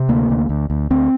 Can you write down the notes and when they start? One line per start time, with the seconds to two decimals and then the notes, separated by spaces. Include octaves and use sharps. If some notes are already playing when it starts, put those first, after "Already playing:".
Already playing: C3
0.09 D2 A#3
0.30 D2
0.49 D2
0.70 D2
0.90 D2 C4